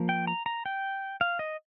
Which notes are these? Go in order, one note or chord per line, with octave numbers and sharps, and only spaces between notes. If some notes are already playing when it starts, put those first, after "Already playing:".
Already playing: F3 A#3
G5
A#5
A#5
G5
F5
D#5